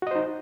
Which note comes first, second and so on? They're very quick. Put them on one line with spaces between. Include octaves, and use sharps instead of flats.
F#4 D#5 C5 D#4